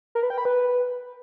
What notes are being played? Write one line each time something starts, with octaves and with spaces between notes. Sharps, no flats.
A#4
B4
G5
B5
B4